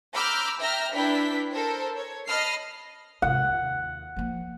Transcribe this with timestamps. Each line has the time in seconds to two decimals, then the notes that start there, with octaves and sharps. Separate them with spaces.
0.13 A#5 B5 D6 E6 F6 G6
0.60 E5 G5 A#5 F6 A#6
0.93 D4 E4 B4 G5 B6
1.51 A4 A#4 C5
1.95 C#5
2.26 D#5 A5 B5 F6 C7
3.22 G#2 C3 F#5
3.45 D#2
4.16 F3 A#3